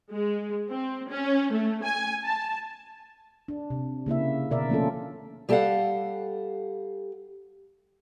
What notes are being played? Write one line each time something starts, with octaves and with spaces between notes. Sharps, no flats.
G#3
C4
C#4
A3
G#5
A5
D4
C3
C#3 A#3 E4 E5
B2 D3 A#4 D5 E5
F3 A3 A#3 C#4 F4 A4
G3 G4 A4 D5 F5 F#5